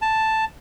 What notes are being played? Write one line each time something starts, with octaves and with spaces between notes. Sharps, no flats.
A5